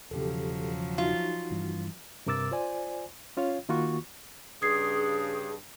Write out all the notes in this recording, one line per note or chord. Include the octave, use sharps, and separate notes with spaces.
E1 C#3 F3 F#3 G4 A4
D#4 F4 F#4
G2 E3
G2 C3 A#4 D6 E6 A6
F4 C5 D5 G#5
C#4 F4 C#5 F5
D#3 A#3 F4 F#4 C#6
G2 C#3 G#4 D#6 G#6 C7